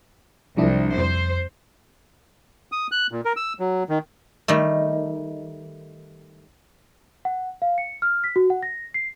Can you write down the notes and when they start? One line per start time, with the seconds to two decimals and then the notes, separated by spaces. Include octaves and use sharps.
0.57 C2 F3 D4 E4
0.98 F2 C5
2.72 D#6
2.92 F#6
3.12 A#2
3.25 A#4
3.36 E6
3.60 F#3
3.89 D#3
4.48 D#3 G3 A3
7.25 F#5
7.62 F5
7.78 C#7
8.02 F6
8.24 B6
8.36 F#4
8.50 F#5
8.63 A#6
8.94 C7